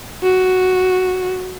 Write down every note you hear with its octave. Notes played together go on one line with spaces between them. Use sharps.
F#4